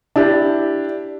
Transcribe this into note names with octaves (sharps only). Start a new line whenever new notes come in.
D4 E4 G4